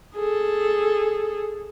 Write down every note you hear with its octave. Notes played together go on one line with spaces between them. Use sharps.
G#4 A4